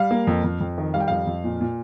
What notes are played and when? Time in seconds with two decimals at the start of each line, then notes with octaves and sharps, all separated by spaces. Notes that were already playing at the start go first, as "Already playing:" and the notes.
Already playing: G3 F5
0.11 A#3
0.27 F2
0.44 F2
0.60 F2
0.78 D#3
0.94 G3 F5
1.00 G5
1.08 F2 F5
1.27 F2
1.44 A#2
1.61 A#2